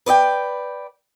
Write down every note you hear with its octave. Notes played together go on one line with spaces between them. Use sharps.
B4 D5 D#5 G5